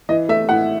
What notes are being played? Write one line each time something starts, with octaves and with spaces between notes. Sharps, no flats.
E3 D#5
A3 E5
A2 F#5